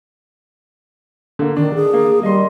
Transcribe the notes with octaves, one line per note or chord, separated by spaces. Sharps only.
D3 A#3
D#3 D4
G#4
A#3
G3 D#5 C6